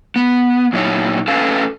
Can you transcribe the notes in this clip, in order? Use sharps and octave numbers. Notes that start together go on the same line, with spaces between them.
B3
A#2 F#3 D#4 E4 B4 C#5
C#4 A4 B4 F5 G#5